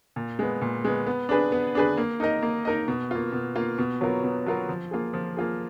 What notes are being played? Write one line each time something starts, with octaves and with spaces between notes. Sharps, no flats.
A#2
G#3 B3
A#2
G#3 B3
B3
D4 G#4 B4
B3
D4 G#4 B4
A#3
D#4 A#4 D#5
A#3
D#4 A#4 D#5
B2
A#3 F4
B2
A#3 F4
B2
F#3 B3 F4 A#4
B2
F#3 B3 F4 A#4
F3
A#3 F4 G#4
F3
A#3 F4 G#4